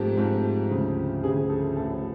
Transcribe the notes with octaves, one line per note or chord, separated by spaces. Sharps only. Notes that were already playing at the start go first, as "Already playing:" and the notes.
Already playing: G#2 F3 A3 C4 G4
G#2 F3 A3 C4
D2 C#3 F3
D2 C#3 F3 G#4
A4
A1 A2 F3 A4